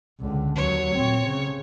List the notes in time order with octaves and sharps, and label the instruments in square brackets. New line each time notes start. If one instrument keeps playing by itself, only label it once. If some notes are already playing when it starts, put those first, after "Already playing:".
[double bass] C#2 D3
[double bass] D#2 F#3 [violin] C#5
[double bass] A#2 C4
C#3